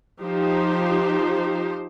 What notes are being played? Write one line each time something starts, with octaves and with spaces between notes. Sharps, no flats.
F3 D#4 G4 C5